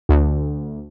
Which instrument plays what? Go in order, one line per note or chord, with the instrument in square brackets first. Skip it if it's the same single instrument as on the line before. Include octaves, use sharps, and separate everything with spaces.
[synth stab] D2